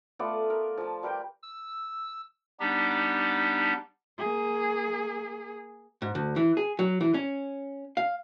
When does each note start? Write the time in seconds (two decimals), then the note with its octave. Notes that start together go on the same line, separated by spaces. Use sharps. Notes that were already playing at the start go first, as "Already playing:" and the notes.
0.19 A3 B3 F4 D5
0.50 A#4
0.78 F3 A5
1.03 G3 A#4 B4 G5
1.43 E6
2.60 G3 B3 D4 D#4 G4
4.18 A#3 G#4
6.02 G#2
6.15 D2
6.36 E3
6.57 G#4
6.79 F#3
7.01 E3
7.14 C#4
7.97 F5